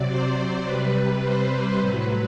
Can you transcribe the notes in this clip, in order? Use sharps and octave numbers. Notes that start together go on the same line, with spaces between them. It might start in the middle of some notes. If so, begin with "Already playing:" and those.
Already playing: C3 F#3 D5
C5
C3 G3 B4
C5
A2 F#3 B4